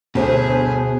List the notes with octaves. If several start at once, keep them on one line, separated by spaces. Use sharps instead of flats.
G1 D2 B2 G#4 C5